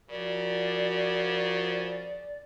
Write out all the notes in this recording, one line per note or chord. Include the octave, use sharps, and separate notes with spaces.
C#3 F3 F#4 A#4 D5